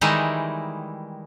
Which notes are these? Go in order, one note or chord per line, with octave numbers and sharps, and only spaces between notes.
D#3 E3 G3 G#3 D#4 E4